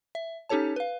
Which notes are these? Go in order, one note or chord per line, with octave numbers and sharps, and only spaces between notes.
E5
C#4 D#4 G4 A4 C#5 A5
B4 F5